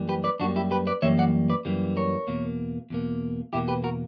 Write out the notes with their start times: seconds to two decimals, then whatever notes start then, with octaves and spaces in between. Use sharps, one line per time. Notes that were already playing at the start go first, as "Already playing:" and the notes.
Already playing: F#2 E3 G3 A#3
0.09 G4 B4
0.24 B4 D5
0.40 F#2 E3 G3 A#3 D4 F#4
0.56 E4 G4
0.71 G4 B4
0.87 B4 D5
1.02 F#2 E3 G3 A#3 C#5 E5
1.19 D5 F#5
1.50 B4 D5
1.65 F#2 E3 G3 A#3
1.97 A#4 C#5
2.28 E2 B2 A#3
2.90 E2 B2 A#3
3.53 E2 B2 A#3 E4 G4
3.68 G4 B4
3.84 F#4 A#4